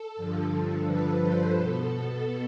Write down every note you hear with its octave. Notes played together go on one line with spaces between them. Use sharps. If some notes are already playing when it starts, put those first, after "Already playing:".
Already playing: A4
G2 D3 F3
A4
B4
C5
B2 B3 A4
A4